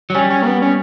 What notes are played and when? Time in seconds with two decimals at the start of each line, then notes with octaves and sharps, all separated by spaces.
0.10 F#3
0.15 G3 C#4
0.30 C#4
0.43 A#3
0.46 B3
0.62 C#4